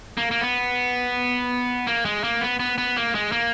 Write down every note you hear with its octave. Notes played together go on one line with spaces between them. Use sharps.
A#3
A#3
B3
A#3
G#3
A#3
B3
B3
B3
A#3
G#3
A#3